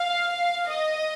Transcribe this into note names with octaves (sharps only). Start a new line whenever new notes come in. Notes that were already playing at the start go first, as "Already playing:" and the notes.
Already playing: F5
D#5